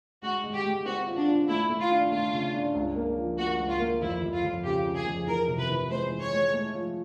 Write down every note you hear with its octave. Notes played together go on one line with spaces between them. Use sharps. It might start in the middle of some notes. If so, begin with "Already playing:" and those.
G#3 F#4
G#3
G4
G#3
C4 F#4
F4
D4
F4
A3 E4
A3
F4
D4
A3 F4
C#3
D4
C#2
A#3
F3
A#3 F#4
C#2
F4
A#3
F2 E4
F2
F4
F2
C#3 G4
C#3
G#4
F2
E3 A#4
C3
B4
E3
G#3 C5
E3
C#5
G#3
A3
F3